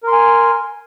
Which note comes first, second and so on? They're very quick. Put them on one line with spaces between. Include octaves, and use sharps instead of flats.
A#4 C6 G#5